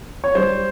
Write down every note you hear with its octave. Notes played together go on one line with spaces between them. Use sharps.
C#5
G3 C5